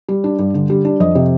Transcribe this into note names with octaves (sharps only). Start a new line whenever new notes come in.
G3
D4
G2
D3
G3
D4
F2 D#5
C3